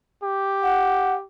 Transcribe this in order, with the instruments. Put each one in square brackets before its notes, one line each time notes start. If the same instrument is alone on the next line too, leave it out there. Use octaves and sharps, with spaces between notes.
[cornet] G4
[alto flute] F#5